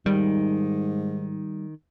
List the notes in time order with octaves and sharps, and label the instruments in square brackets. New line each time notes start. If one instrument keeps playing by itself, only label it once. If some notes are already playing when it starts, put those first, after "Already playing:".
[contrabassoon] G#2 [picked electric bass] D#3 [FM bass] G3